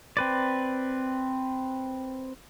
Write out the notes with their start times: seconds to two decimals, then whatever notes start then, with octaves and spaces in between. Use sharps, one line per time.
0.17 C4 B4 D5